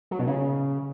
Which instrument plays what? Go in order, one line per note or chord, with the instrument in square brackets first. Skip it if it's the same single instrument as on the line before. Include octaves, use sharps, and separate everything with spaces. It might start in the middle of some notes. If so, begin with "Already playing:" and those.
[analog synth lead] F#3
B2
C#3